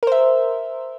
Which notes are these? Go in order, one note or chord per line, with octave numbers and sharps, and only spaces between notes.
A#4 C5 E5